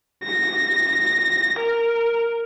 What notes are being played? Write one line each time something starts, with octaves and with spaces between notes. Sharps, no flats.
A#6
A#4